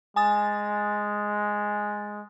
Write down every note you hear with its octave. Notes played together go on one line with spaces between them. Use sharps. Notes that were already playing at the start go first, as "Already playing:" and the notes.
G#3 G#5 D#6 A6